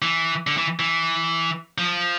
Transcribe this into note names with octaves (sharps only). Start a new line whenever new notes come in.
E3
D3
E3
E3
F3